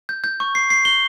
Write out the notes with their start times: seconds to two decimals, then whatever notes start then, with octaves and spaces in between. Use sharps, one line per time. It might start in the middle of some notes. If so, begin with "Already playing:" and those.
0.09 G6
0.24 G6
0.40 C#6
0.55 C7
0.70 C7
0.85 G7